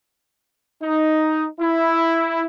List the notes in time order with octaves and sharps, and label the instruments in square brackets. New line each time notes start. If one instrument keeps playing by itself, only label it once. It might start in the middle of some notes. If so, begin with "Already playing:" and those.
[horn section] D#4
E4